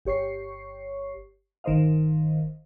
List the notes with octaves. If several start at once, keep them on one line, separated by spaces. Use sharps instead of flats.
G1 G4 C#5 C#6 C7
G1 D#3 A#4 C5 D#5 F5